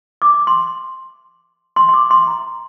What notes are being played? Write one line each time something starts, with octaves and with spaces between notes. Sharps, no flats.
D6
C6
C6
C6
D6
C6
A#5